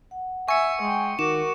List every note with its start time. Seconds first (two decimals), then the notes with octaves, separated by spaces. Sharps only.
0.11 F#5
0.48 E5 G#5 C#6 C#7
0.81 G#3 G5
1.19 D#3 F#4 A#4 D6 E7